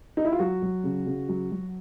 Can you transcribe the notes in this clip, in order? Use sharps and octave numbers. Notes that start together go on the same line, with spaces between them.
D#4
E4
F4
F#3 F#4
F#3
C#3
C#3
F#3
F#3